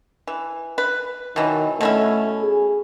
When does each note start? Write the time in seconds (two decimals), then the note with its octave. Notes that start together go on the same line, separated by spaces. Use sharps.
0.27 E3
0.78 B4
1.36 B2 D#3 E3 F#3
1.81 B2 A3 C#4 E4
2.42 G#4